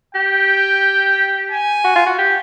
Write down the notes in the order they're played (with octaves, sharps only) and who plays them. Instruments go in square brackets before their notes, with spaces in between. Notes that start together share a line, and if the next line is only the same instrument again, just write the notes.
[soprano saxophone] G4 [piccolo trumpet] G5
[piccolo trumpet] G#5
[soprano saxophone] F#4
F4
F#4
G4